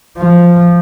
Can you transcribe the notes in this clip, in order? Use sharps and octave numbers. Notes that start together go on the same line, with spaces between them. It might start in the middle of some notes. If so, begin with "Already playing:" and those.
F3